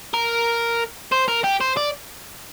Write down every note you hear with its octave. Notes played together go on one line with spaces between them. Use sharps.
A#4
C5
A#4
G4
C5
D5